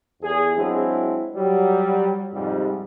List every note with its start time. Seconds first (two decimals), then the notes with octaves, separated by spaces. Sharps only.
0.22 E2 G#4
0.56 F#3 G#3 C4 D4 E4
1.34 F#3 G3
2.32 F2 G#2 C3 G3